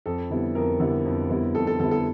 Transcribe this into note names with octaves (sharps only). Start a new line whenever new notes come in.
F2 A4
D3 G3 B3 E4
F2 A#4
D3 G3 B3 E4
F2
D3 G3 B3 E4
F2 A4
A4
D3 G3 B3 E4 A4
A4